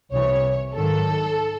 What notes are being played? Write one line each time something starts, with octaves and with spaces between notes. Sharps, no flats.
C2 C3 E3 C#5
G#2 D#3 F#3 A4